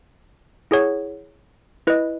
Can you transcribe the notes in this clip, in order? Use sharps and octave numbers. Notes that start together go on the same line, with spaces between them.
E4 G#4 C#5 F#5
E4 B4 D#5